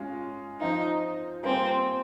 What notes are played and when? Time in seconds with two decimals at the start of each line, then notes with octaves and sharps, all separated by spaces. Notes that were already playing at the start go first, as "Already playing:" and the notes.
Already playing: G#3 C#4 F4
0.60 F3 C4 D#4 F4
1.43 G3 A#3 C4 F4 G#4